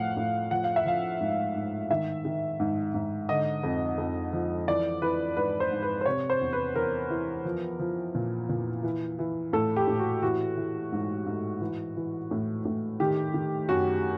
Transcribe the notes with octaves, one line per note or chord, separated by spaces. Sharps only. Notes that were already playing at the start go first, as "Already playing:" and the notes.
Already playing: A2 F3 F5 F#5
A2
F3 F#5
F5
E5
F3 F5
G#2
G#2
D#3 E5
D#3
G#2
G#2
D3 D#5
F2
F2
F3
E3 D5
E3 B4
G#2 B4
C5
G#2
B4
C5
C3 C#5
C5
E2
B4
E2 A#4
E3
F3
F3
A#2
A#2
E3
E3
A2 A4
G4
A2
F#4
E3 F#4
E3
G#2
G#2
E3
E3
A2
A2
D#3 G4
D#3
F#2 F#4